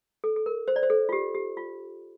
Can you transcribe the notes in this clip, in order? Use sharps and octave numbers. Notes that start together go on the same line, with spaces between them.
A4
A4
A#4
C5
D5
C5
A4
F4
G4
G4
F4